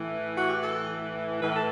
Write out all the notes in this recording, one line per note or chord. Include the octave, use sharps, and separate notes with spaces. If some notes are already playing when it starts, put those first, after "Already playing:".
Already playing: A2 E3
F#4
G4
A4
A2 E3 B4
A4